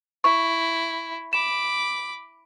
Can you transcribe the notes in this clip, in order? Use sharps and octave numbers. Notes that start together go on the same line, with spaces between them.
E4 C#6
B5 D6 E7